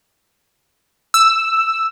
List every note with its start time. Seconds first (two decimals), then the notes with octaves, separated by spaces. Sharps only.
1.14 E6